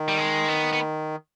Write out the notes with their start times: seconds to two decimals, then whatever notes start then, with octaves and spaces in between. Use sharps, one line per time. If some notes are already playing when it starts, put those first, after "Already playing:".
Already playing: D#3
0.08 G3
0.18 G#3
0.49 B3
0.73 B3